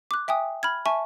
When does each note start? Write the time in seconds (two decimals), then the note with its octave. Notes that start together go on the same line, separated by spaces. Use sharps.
0.11 D6 F#6
0.28 E5 G5 G#5 D#6
0.63 B5 F6 G#6
0.86 E5 G#5 A5 C#6